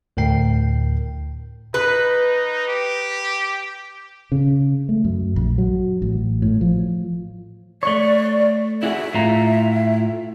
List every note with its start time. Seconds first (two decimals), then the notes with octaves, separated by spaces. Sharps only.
0.17 D2 A2 A#4 G5 C7
1.74 D#4 B4
2.68 G4
4.32 C#3
4.89 A3
5.05 F#2
5.36 A#1
5.58 F#3
6.02 A1
6.42 A2
6.61 F3
7.83 A3 C#5 D5
8.83 E4 F#4 G#4 E5
9.15 A2 F4 A#5